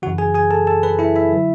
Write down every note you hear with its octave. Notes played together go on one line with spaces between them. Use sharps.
F#2 C#3 E3 F#4 F#5
G#4 G#5
G#4 G#5
A4 A5
A4 A5
B4 B5
E4 E5
E4 E5
D3 F#3